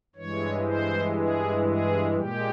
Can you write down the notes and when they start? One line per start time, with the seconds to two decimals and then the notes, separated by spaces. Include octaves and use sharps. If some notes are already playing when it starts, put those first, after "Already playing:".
0.15 G2 E3 G#3 C#5
0.66 C5
1.17 G#4
1.66 G#4
2.16 A#2 G#3 G4